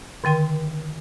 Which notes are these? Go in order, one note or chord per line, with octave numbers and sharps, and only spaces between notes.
D3 D#3 G5 C6